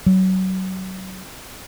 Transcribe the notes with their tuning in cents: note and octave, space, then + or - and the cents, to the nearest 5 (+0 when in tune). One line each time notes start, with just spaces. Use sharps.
F#3 +25